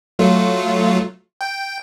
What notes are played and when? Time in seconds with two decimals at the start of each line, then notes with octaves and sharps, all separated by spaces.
0.19 F#3 A3 F4
1.41 G5